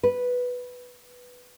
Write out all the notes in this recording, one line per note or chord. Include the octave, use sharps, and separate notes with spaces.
B4